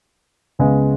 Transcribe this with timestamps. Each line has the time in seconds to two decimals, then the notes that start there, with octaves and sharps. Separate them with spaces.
0.59 C#2 C#3 G#3 B3